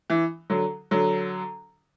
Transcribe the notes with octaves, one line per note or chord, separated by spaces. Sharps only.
E3
D3 F#3
D3 F#3